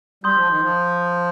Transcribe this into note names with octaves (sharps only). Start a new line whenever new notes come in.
G3 C6 D#6 G6
F3
D#3
F3